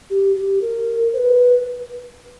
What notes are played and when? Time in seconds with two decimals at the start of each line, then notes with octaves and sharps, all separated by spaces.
0.10 G4
0.36 G4
0.62 A#4
1.13 C5
1.18 B4